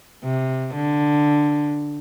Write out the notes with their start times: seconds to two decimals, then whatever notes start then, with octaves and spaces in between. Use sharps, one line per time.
0.24 C3
0.75 D3